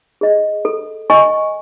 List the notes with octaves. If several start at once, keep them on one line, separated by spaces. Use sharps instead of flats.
G#4 D#5
A4
D#5 G#5 C#6